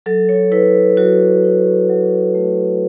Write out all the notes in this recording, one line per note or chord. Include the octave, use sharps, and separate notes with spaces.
F#3 A4
C#5
E4 B4
F#3 F#4
E4
F#3
A3